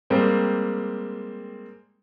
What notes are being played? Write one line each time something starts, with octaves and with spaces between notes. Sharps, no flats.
G3 G#3 A#3 C4